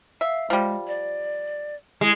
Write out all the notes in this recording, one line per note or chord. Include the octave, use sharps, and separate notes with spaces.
E5 F5
F3 G3 G#3
D5
G#3 E4